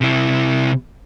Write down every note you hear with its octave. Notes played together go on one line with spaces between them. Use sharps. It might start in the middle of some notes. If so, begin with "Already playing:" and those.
C3 E4